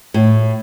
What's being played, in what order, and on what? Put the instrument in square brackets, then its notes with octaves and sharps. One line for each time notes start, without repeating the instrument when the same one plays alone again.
[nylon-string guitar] A2